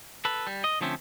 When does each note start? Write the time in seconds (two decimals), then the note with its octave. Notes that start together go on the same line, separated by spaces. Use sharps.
0.25 A4 B4
0.47 G3
0.64 D#5
0.81 D3 F3 A3 C4 C#4